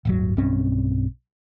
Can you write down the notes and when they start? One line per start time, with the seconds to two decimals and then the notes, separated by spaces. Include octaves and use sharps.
0.05 D1 G1 F#3
0.37 B1 G2 C4 C#4